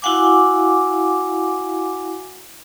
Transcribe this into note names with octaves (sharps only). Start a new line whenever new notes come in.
E4 F#4 F5 F#5 G#5 D6